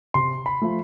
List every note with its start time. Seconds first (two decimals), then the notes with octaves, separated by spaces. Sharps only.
0.14 C3 C6
0.46 B5
0.62 F3 A3